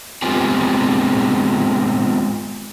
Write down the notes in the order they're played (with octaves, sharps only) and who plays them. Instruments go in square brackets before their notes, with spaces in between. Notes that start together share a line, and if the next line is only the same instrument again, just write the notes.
[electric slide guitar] G#3 B3 C4 F4 G4 G#4